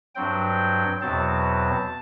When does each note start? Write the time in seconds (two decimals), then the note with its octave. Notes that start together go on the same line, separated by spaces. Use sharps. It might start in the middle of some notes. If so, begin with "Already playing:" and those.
0.15 G2 F#3 C4 G5
1.01 E2 B2 F#3 C4 A5